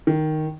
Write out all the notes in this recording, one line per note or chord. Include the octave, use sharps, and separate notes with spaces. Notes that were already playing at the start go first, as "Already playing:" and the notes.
D#3